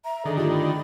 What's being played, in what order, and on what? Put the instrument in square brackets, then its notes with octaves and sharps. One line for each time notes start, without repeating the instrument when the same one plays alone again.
[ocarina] E5 [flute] A#5
[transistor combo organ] D3 D#3 [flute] G#4 [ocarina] A4
[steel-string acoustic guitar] A3 E4 G4 [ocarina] F4
[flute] B5